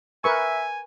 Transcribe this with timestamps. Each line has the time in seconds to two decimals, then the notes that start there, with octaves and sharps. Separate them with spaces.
0.24 A#4 B4 E5 G#5 C#6